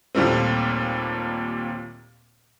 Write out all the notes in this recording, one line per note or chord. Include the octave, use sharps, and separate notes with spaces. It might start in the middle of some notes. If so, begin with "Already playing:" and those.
D#2 A#2 G3 A3 C4